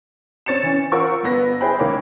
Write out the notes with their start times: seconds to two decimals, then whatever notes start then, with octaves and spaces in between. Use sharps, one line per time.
0.46 C4 C#5 A6 C#7 E7
0.63 E3 C#4
0.92 F4 A#4 C5 F#5 C#6 E6
1.23 G1 B3 A#6
1.61 E4 G#4 C5 G5 B5
1.79 C#2 D#3 A#3 C#5 D5